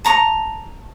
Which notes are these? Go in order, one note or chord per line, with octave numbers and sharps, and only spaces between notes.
A5 A#5 C#6